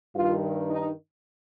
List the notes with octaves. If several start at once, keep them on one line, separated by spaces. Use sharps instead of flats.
G2 D#3 F4
D#4